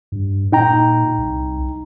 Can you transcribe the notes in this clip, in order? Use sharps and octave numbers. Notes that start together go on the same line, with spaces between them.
G2
A#2 D#4 G5 A#5
C2